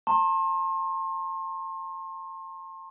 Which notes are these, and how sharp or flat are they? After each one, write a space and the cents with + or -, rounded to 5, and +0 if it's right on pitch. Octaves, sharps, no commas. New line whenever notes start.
A5 +35 C6 +40